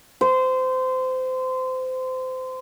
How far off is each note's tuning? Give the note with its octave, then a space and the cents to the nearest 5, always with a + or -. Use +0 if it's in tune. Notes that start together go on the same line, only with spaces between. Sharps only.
C5 -25